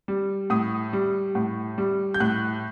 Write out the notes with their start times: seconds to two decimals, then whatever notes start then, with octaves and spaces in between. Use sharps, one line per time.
0.08 G3
0.50 A2 D#6
0.93 G3
1.35 A2
1.78 G3
2.14 G6
2.20 A2 F#6